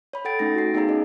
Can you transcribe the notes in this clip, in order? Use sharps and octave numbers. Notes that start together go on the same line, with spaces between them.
C#5 B5
A4 F#5 G5 A6 D7
A3 C#4 D#4 A6 A#6
F#4 C7
B3 D#4 G#4 C#5 F5 A#5
C#4 G#4 D5 D#5